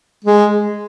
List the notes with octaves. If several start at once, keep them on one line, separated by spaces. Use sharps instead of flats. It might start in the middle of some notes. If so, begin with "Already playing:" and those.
G#3